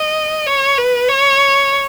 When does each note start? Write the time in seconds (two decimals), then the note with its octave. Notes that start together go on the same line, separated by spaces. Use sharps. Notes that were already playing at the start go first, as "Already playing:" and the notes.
Already playing: D#5
0.46 C#5
0.78 B4
1.09 C#5